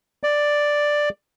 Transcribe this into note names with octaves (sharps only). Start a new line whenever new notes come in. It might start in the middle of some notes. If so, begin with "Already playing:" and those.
D5